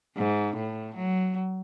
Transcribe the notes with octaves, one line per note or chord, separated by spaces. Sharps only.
G#2
A2
F#3